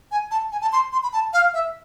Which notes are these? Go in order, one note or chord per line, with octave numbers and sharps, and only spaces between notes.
G#5
A5
G#5
A5
C6
C6
B5
A5
F5
E5